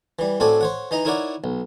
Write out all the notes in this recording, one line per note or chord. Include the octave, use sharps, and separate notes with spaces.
E3 G3
A2 C4 F#4 A4 D5 G#5
C5 C#5 F#5
E3 D#4 D#5 A#5
D#4 E4 A#4 C#5 D5 F#5
B1